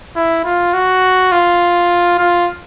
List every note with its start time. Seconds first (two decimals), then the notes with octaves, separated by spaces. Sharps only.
0.16 E4
0.45 F4
0.74 F#4
1.32 F4
2.18 F4